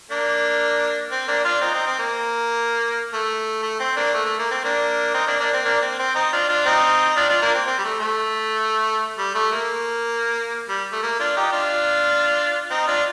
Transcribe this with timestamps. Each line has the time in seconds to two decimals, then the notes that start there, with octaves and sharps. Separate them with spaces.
0.10 A#3 D4
1.11 C4
1.28 A#3 D4
1.44 D4 F4
1.61 C4 D#4
1.74 C4 D#4
1.87 C4
1.99 A#3
3.13 A3
3.63 A3
3.80 C4
3.96 A#3 D4
4.14 A3
4.26 A3
4.39 A#3
4.51 C4
4.64 A#3 D4
5.14 C4 D#4
5.27 A#3 D4
5.39 A#3 D4
5.53 C4
5.65 A#3 D4
5.82 C4
5.99 C4
6.15 C4 D#4
6.33 D4 F4
6.49 D4 F4
6.65 C4 D#4
7.16 D4 F4
7.28 D4 F4
7.42 A#3 D4
7.54 C4
7.66 C4
7.78 G3
7.84 A3
8.00 A3
9.18 G3
9.35 A3
9.52 A#3
10.68 G3
10.92 A3
11.02 A#3
11.19 D4 F4
11.36 D#4 G4
11.52 D4 F4
12.70 C4 D#4
12.87 D4 F4